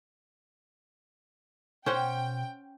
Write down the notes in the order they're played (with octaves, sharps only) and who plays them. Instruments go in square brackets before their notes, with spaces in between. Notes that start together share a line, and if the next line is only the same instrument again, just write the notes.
[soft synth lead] B2 [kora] C#4 C5 F#5 [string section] G5